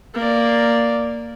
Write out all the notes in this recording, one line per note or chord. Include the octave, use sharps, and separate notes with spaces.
A#3 D5